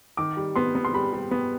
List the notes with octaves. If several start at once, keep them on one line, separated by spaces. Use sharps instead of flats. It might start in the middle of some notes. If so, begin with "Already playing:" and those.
D#3 D6
G3
B3 C6
B3
C6
G3 B5
G3
B3